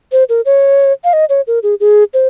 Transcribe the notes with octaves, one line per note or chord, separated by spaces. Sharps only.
C5
A#4
C#5
F5
D#5
C#5
A#4
G#4
G#4
C5